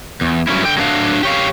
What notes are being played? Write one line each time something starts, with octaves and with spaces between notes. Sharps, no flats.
E2
G2 F#3 C#4 E4
D3 G5
F#3 A3 D4 F5
G4 C#5 F5